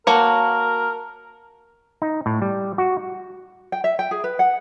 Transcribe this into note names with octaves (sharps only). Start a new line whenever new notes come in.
A#3 F#4 A#4 C#5 A5
D#4
A2
G3
F#4
G5
E5
G5
G#4
B4
F#5